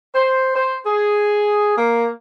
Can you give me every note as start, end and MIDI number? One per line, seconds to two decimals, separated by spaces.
0.15 0.53 72
0.55 0.76 72
0.86 1.72 68
1.76 2.08 58